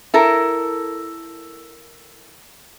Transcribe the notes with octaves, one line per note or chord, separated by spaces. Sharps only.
E4 A4 A#4